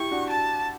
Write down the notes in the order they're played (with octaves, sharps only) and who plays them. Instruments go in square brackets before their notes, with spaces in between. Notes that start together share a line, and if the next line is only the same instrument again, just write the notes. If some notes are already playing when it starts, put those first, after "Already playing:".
Already playing: [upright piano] E4 G4 [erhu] C#6
[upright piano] D4 F#4
[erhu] A5